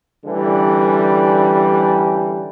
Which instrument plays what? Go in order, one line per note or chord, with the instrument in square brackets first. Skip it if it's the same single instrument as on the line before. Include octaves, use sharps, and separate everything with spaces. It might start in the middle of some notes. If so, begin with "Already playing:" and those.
[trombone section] A1 D3 E3 G3